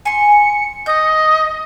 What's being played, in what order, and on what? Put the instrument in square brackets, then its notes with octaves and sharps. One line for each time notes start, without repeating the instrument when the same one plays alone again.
[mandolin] G#5 C6 [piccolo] C#7
[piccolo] D#5 [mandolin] D#6 G6